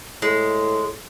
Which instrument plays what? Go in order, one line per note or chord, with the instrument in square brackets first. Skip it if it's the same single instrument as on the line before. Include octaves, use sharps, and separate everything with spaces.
[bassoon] A2 [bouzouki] G#3